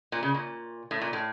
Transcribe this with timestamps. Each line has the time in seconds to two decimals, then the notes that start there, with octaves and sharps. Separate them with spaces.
0.12 A#2
0.23 C#3
0.34 A#2
0.91 A2
1.02 A#2
1.13 A2